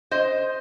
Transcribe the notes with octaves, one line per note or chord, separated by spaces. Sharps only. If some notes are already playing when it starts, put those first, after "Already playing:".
C5 D#5